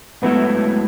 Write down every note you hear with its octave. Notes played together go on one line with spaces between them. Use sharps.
G#2 F#3 A3 B3 E4